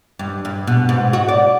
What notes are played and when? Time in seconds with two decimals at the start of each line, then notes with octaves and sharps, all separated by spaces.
0.19 G2
0.45 G2
0.67 B2
0.89 G#2
1.13 F#4
1.28 D5